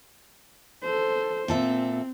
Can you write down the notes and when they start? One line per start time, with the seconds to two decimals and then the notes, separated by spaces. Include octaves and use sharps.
0.83 A4 C5
1.48 A#2 C4 A4 E5